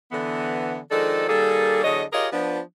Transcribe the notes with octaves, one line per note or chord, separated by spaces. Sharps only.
D3 E3 B3
D#3 F3 G#3 D4 A4
D#3 G3 A#3 G#4 A4
E2 D3 F#3 C#5 D#5
F4 G4 G#4 A#4 C#5 D#5
F3 B3 D4